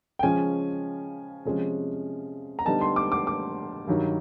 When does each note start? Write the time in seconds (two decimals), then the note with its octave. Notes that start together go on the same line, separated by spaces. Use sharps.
0.19 G5
0.23 C#3 F3 G#3 C#4 G#5
1.45 C3 F3 G#3 C#4
2.59 A#5
2.66 D3 G3 B3 D#4 A5
2.81 C6
2.96 D6
3.12 D6
3.27 D6
3.87 G2 D#3 F#3